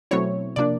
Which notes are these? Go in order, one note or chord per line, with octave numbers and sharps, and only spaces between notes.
B2 F#3 A3 C4 E4 C#5
C3 F3 A#3 D4 D5